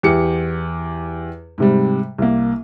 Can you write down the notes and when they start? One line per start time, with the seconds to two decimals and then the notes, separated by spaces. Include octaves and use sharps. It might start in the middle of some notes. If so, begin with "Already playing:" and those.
0.03 E2 G4 C#7
1.58 G#2 C3 G3
2.18 C2 A#3